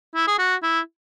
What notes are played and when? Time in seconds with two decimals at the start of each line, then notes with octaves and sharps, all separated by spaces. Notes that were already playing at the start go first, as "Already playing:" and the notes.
0.16 E4
0.28 G#4
0.39 F#4
0.63 E4